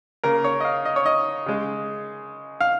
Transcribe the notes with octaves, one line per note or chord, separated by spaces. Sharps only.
C#3 A#3 A#4
C#5
D#5
F5
D#5
C#5
D#5
C#3 G#3
F5